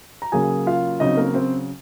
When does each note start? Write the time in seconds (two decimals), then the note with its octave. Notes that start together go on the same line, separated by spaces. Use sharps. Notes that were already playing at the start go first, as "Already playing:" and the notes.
0.22 A#5
0.32 C#3 F#3 A#3 G#4 G#5
0.66 F4 F5
1.00 C#3 F#3 C4 D#4 D#5
1.17 A#3 A#4
1.34 C4 C5